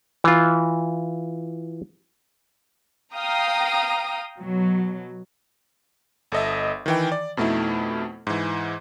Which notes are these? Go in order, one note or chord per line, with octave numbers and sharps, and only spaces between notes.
E3 F4
F5 G5 A#5 D#6
B2 F#3
G1 A4 D#5 E5
D#3 E3 G5
D5
F2 B2 A3 D#4 E4
G#2 E3